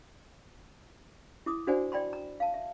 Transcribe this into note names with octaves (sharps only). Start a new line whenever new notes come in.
E4 D6 D#6
D4 F#4 C5 D5 F#5 G#5
D5 G5 B5 C6
A#5
F5 A5
E5